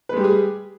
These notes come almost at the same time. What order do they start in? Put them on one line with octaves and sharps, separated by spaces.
B4 G#3 G3 G4 G#4